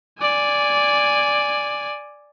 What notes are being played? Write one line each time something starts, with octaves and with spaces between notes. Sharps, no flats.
D5 G#5